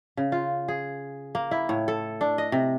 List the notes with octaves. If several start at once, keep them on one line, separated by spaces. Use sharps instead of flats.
C#3
F4
G#4
A#3
E4
A2
A4
D4
D#5
C3